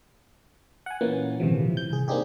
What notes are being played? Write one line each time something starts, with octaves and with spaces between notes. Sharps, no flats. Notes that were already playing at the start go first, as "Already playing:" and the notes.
F#5 G#5
A#2 E3 A#3 B3 C#4
A#1 D#2 G#2 C3 E3 F3
A1 G6
C2 G#4
A#3 C4 D4 D#4 G4 G#4